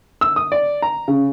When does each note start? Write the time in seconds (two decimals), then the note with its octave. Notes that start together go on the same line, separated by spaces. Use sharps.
0.21 E6
0.36 D#6
0.52 D5
0.82 A#5
1.08 C#3